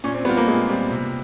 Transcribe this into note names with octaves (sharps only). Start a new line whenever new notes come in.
A#2 C#4
C4
G3 B3 C4 F4
A#3
A#2 G#3
G3 C4 F4
C3